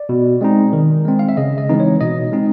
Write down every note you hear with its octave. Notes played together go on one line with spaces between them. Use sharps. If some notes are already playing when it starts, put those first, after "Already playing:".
Already playing: D5
B2
G#3 C4 D#4
D#3
G#3 C4
F5
E5
C#3 D#5
D#5
E3 G#3 C4 D#4
C#5
B2 D#5
G#3 C4 D#4